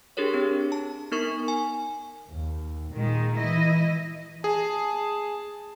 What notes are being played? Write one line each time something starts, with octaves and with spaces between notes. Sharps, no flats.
D4 G4 G#4 A#4 C#5
C4 D4
A5
B3 D#4 A#4 C#6
G#5
D#2
A#2 D#3 G#3
E3 E4 D#5
G#4 A5